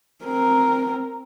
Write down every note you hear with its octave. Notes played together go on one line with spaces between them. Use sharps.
C4 A#4